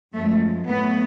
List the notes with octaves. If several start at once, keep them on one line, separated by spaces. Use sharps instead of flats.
F#2 F3 G#3 A3
A2 F#3 A3 B3